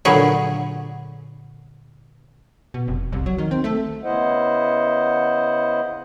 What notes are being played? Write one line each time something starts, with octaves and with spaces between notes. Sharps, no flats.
A#2 D3 F#3 G#4 B4
B2
F1
C2
F#3
D#3
C4
A3
C#3 B3 E4 C5 D#5 F#5